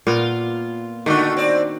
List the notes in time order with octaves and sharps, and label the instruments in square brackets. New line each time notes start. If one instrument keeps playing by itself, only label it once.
[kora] A#2 B3 A#4 [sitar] F4
[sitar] D3 A3 [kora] D#3 D4 F#4
[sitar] C4 D5